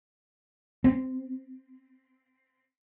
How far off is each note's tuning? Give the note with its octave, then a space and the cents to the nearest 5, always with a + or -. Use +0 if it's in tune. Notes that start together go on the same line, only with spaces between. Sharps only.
C4 -15